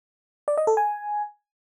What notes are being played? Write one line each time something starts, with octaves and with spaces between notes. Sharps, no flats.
D5
D#5
A4
G#5